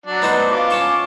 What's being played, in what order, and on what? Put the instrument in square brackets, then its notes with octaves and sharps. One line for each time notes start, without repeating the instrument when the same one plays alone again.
[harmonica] F#3 D4
[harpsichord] B3 D#4 C5
[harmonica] F4 D6
[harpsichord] C#4 A5 C#6